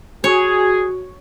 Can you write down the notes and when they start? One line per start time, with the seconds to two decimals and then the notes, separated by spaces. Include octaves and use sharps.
0.24 F#4 G#4 C#5